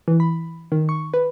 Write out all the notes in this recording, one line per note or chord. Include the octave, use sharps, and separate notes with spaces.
E3
B5
D#3
C#6
B4